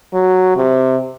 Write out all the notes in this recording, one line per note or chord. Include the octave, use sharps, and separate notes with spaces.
F#3
C3